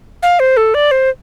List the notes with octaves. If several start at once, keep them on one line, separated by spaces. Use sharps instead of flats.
F5
C5
A4
D5
C5